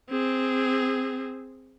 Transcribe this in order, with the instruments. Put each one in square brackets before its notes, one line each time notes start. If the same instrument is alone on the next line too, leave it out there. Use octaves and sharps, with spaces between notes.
[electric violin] C4 G#4